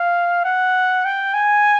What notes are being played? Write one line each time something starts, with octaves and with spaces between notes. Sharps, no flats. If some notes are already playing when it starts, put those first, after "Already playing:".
Already playing: F5
F#5
G5
G#5